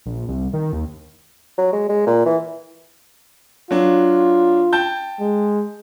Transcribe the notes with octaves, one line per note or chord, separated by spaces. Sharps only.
A#1
C2
D#3
D#2
F#3
G#3
G#3
A#2
E3
F#3 D4 F4
G5 A5 G6
G#3